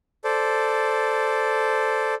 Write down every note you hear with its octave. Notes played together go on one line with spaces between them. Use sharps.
A4 C5 D5